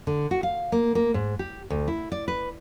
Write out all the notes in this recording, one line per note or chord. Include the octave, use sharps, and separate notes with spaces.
D3
F#4
F5
A#3
A#3
G#2
G4
D2
E4
D5
B4